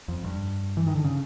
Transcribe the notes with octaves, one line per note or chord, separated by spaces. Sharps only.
F2
G2
E3
D#3
D3
C#3